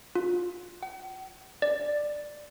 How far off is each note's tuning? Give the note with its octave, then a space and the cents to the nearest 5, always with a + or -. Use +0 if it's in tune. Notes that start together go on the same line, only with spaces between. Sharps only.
F4 +25
F#5 +45
D5 +10